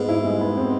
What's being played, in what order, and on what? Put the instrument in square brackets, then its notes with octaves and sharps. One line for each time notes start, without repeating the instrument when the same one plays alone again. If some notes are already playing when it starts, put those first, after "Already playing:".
Already playing: [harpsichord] G#2 [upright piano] B3
[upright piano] E4
G#3
B3
C4